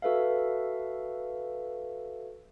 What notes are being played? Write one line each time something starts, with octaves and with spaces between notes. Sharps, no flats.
F#4 A4 B4 E5 F5